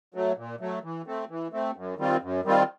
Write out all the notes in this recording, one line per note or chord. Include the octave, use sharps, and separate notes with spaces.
F#3 A3
A#2
F#3 A3
E3
A3 C4
E3
A3 C4
F#2
D#3 G3 C4 F4
F#2
D#3 G3 C4 F4